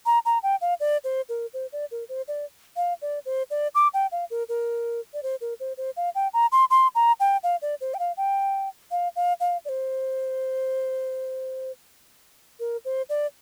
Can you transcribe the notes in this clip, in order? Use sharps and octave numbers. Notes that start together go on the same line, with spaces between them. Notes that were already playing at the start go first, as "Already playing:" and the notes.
A#5
A#5
G5
F5
D5
C5
A#4
C5
D5
A#4
C5
D5
F5
D5
C5
D5
D6
G5
F5
A#4
A#4
D5
C5
A#4
C5
C5
F5
G5
A#5
C6
C6
A#5
G5
F5
D5
C5
G5
F5
G5
F5
F5
F5
D5
C5
A#4
C5
D5